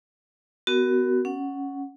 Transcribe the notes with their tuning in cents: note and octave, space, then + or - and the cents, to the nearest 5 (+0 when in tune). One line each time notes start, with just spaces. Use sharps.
B3 +20 F#4 +20 A#4 +10
C#4 +0 F#5 +0